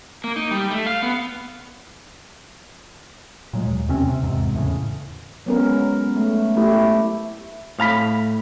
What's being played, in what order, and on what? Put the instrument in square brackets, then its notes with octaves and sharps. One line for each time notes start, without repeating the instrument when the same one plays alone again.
[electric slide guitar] A#3
D#4
G3
A3
F5
B3
[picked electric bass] A#2 F#3 G#3
D#2
E2 C3 C4 C#4
C3
D#1 E2 G#2 C3
E2 A2 C#3
[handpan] F#3 G#3 B3 C#4 A#4
A3
A3 E4 G4
[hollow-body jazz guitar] A2 F5 A#5 B5